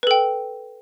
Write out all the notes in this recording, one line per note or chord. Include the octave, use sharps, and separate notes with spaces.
A4 B4 G5